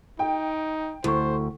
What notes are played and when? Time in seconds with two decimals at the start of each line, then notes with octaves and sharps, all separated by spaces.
0.19 D#4 G5
1.04 D2 E4 C5 C#6